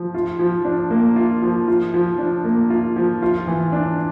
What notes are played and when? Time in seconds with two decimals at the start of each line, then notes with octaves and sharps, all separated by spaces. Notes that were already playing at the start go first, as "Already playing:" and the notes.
Already playing: F3
0.14 F4
0.39 F3
0.65 D4
0.90 A#3
1.16 F4
1.42 F3
1.68 F4
1.94 F3
2.18 D4
2.44 A#3
2.70 F4
2.96 F3
3.22 F4
3.47 E3
3.72 D4